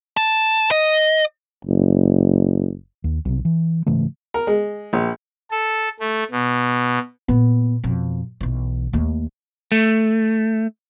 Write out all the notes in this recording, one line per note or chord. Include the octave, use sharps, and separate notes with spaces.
A5
D#5
F#1
D#2
B1 C3
E3
G#2 C#3 E3 A3
A#4
G#3
A#1
A4
A3
B2
A#2 B3
F2 B2
B1 E3
D#2 A3
A3